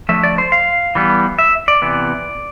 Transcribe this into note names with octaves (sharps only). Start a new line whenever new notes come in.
D3 F3 A3 E5
D5
C5
F5
E3 G3 B3
E5
D5
C3 E3 B3